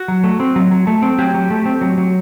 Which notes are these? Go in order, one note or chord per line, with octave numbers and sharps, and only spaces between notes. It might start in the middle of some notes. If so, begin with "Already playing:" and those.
Already playing: F#4
F#3
A3
C4
F#3
F#3
A3
C4
F#3 G4
F#3
A3
C4
F#3
F#3